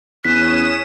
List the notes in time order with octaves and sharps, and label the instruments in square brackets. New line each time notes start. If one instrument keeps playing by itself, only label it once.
[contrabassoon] E2 [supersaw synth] C#4 D#6 E7 [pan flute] F#6 [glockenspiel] B6